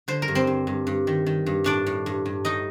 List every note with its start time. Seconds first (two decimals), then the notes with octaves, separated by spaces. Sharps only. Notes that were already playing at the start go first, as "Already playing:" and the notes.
0.08 D3 C5
0.22 A#4
0.28 G2
0.35 C4 C5
0.47 G2
0.67 G2
0.87 G2
1.07 D#3
1.26 D#3
1.46 G2
1.64 A2 D4 D5
1.86 A2
2.06 G2
2.26 G2
2.45 A2 D#4 D#5